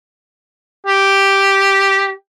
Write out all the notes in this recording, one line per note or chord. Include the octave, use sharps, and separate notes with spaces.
G4